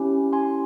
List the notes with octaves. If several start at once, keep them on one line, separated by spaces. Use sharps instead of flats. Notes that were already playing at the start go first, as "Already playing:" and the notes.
Already playing: C#4 E4 G4
G#5 C6